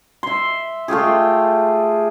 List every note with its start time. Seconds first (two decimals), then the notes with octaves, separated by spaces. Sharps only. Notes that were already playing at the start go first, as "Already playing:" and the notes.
0.23 E5 C6
0.88 A3 F4 G4 G#4